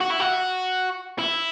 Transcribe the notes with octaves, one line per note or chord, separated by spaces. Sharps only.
F#4
E4
F#4
E4